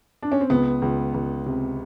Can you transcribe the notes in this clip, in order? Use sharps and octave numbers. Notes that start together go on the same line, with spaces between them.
D4
C#4
C4
C#2 B3
C#2
C#2
C3